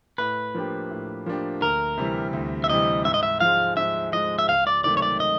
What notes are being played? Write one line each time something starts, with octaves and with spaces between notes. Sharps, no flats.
A2 B4
F3 A#3 D4 G4
A2
F3 A#3 D4 G4
D2 A#4
C3 E3 G3
D2
E5
C3 E3 G3 D#5
G#2 E5
D#5
E5
F3 G#3 F5
G#2 E5
F3 G#3 D#5
E5
C#2 F5
D5
C3 D#3 F#3 A3 D5
C#5
D5
D#5